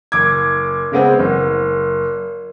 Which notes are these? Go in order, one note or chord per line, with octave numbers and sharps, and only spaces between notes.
F#1 D6 G#6
C#3 G#3 B3 C4
F#1